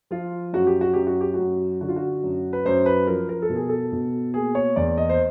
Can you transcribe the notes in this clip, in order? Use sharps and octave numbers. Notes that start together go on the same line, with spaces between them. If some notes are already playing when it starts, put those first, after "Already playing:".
F3 F4
F#2 F#4
G4
F#4
F#2 G4
F#4
G4
F#2 F#4
D3 F#4
F4
F#4
F#2
B4
F#2 C5
B4
F3 A#4
A#4
A4
B2
G#4
A4
B2
A#3 G#4
C#5
E2 D5
D#5
C5